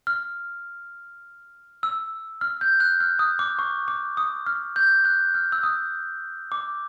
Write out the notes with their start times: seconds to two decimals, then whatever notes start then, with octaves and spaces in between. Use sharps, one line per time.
0.07 F6
1.83 E6
2.41 F6
2.61 G6
2.80 F#6
3.00 F6
3.19 D#6
3.39 D6
3.59 C#6
3.88 D6
4.17 D#6
4.46 F6
4.76 G6
5.05 F#6
5.35 F6
5.52 E6
5.63 D#6
6.52 D6